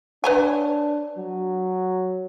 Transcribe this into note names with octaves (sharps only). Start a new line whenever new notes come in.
D4 B4 C#5 G#5
F#3